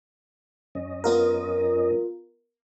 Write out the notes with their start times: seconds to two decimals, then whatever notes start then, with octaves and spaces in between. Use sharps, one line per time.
0.75 F#2 C#4 D#5
1.04 B3 F4 A#4